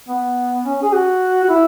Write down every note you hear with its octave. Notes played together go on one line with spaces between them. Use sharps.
B3
C#4
G#4
F#4
F#4
E4